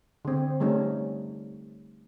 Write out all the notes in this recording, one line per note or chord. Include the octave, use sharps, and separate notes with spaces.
D3 C4
G3 A3 C#4 D#4